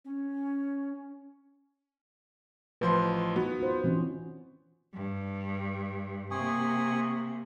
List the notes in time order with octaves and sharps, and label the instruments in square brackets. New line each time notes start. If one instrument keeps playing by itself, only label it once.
[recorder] C#4
[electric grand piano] A1 F3 C6 [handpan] B4
[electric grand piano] B3 [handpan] D#4 F#4
[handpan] F4 C5
E3 C4 C#4
[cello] G2
[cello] C3 A#3 [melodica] G#5 C#6 D#6